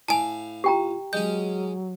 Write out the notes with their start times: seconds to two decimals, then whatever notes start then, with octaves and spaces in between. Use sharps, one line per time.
0.08 A2 F5 G#5 A5
0.64 F4 G4 G5 A#5
1.13 F#3 G#3 C#4 G6